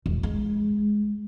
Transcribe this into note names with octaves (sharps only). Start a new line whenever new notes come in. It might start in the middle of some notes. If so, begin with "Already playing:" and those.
E1
G#3